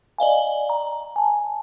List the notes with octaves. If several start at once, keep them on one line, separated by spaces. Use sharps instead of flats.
D5 D#5 F5 G#5
A#5
G#5 A5